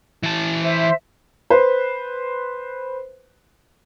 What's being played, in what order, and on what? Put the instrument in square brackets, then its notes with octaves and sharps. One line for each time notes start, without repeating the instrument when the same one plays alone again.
[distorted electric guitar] E3 A5
[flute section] C5 E5 C6
[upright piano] B4 C5